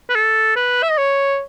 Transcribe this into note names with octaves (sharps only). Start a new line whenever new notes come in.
B4
A4
B4
E5
D#5
C#5